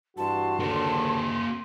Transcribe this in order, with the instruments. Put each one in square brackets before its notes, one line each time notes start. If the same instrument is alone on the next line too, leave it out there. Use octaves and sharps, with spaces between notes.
[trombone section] G2 E3 F#4 [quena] A5 [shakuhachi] C6
[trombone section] D#2 G#2 D3 [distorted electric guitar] A#3 F#4